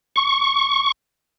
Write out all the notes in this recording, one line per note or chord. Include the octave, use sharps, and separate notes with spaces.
C#6